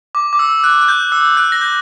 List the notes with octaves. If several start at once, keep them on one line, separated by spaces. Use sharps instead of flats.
D6
D6
E6
F#6
F#6
G6
E6
F#6
A#6
G6